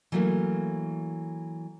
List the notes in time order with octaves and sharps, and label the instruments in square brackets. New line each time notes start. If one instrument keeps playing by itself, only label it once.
[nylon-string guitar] E3 F#3 A3 A#3 C#4